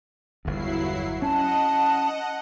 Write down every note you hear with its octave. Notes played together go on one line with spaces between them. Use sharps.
G1 E2 F#3 E4 C7
C#4 D#5 F#5 A5